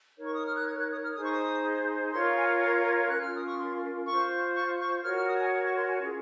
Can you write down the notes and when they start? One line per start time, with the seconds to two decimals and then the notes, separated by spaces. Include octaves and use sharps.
0.18 D#4 A#4 C#5
0.25 C#6
0.35 D#6
0.46 F6
0.56 F#6
0.67 G#6
0.78 F#6
0.91 D#6
1.03 F6
1.15 D#4 G#4 C5 D#6
1.23 C#6
1.31 D#6
2.12 F4 A#4 C#5 C6
2.36 G#5
2.61 A#5
3.08 C#4 F4 A#4 F#6
3.21 F6
3.34 D#6
3.46 C#6
3.58 C6
4.06 F4 C5 C#6
4.55 C#6
4.79 C#6
5.03 F#4 A#4 C#5 F6
5.16 F6
5.28 D#6
5.40 G#5
5.52 F#5
5.64 C#6
5.77 C6
5.88 G#5
6.01 C#4 F4 G#4